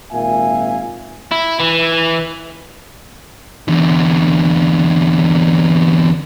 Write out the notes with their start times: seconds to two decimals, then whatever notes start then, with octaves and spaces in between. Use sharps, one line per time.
0.12 G#1 A#2 E5 F5 G#5
1.32 E4
1.59 E3
3.68 E2 D3